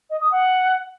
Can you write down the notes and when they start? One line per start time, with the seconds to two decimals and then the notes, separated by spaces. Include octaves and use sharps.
0.10 D#5
0.21 D#6
0.32 F#5